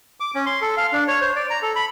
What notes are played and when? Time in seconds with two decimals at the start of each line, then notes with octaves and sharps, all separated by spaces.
0.20 D6
0.35 C#4
0.46 C6
0.62 A4
0.77 F5
0.92 D4
1.08 C#5
1.21 C5
1.36 D5
1.50 A#5
1.62 A4
1.76 B5